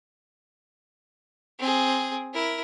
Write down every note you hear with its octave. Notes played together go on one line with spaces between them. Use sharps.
C4 G#4
E4 A#4